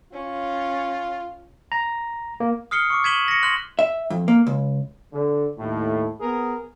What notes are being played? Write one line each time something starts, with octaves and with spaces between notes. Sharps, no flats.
C#4 F4
A#5
A#3
D#6 F6 C7 C#7 G7
C#6 D6
G#6 B6 D#7 E7 F#7 G7
A#6 C#7
C6 F#6 F#7
E5
F2
A#3
C#2
D3
D#2 A2
B3 G#4 A#4